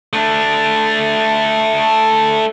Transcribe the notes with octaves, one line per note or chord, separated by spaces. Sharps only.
A3 D4